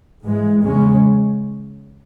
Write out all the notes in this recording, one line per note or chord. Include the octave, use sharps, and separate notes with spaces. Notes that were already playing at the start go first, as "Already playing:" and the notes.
G#2 E3 G#3
E2 C#3 G#3 C#4